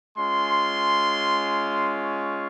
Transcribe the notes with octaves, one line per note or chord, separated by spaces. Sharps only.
G#3 C#4 F4 C6
C#6